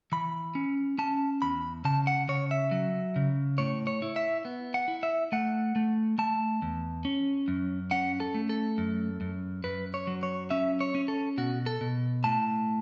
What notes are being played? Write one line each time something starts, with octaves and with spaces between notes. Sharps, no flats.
E3 B5
C#4
C#4 A5
E2 B5
C#3 A5
F#5
C#3 C#5
E5
F#3
C#3
A2 C#5
C#5
E4
E5
B3
F#5
E4
E5
A3 F#5
A3
A3 A5
E2
C#4
F#2
C#4 F#5
A4
A3
A4
F#2
F#2
F#2 B4
C#5
F#3
C#5
C#4 E5
C#5
C#4
A4
B2 F#4
A4
B2
A2 A5